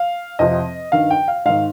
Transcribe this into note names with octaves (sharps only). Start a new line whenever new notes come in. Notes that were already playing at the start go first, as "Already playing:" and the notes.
Already playing: F5
F2 C3 F3 D#5
G2 D#3 F5
G5
F5
G#2 D#3 F5